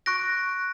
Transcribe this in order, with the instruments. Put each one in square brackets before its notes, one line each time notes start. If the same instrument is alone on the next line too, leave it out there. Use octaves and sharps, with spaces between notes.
[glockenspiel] C#6 F#6 A#6 D7